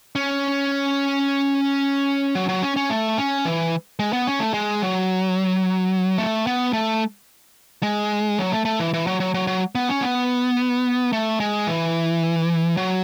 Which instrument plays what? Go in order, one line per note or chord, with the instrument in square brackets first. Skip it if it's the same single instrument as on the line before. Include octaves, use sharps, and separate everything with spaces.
[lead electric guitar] C#4
F#3
F#3
C#4
C#4
A3
C#4
E3
G#3
B3
C#4
A3
G#3
F#3
A3
B3
A3
G#3
F#3
A3
A3
E3
E3
F#3
F#3
F#3
F#3
B3
C#4
B3
A3
G#3
E3
F#3